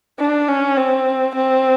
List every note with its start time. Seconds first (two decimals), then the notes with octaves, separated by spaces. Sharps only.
0.19 D4
0.48 C#4
0.77 C4
1.35 C4